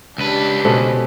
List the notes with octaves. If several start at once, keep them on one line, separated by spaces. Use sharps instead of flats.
C#2 D4 G4 B4
B2 C#4 A4 C5